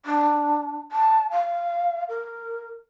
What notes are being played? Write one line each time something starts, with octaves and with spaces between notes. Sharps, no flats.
D4
A5
F5
A#4